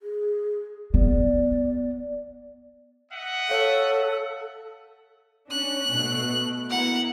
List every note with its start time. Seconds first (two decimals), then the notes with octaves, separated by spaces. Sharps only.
0.02 G#4
0.94 B3 D5
3.12 D#5 E5 F#5
3.50 A4 C#5 F5
5.51 C#4 D4 F#6
5.90 B2 A3
6.70 B3 E4 A#4 F#5